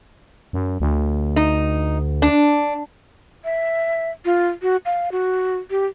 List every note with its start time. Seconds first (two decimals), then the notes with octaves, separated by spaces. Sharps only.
0.53 F#2
0.80 D2
1.36 D#4
2.22 D4
3.45 E5
4.25 F4
4.62 F#4
4.86 F5
5.12 F#4
5.71 G4